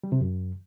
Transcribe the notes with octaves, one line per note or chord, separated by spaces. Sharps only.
G3
C3
F#2